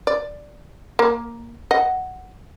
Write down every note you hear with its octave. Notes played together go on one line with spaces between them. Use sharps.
D5
A#3
D#5 F#5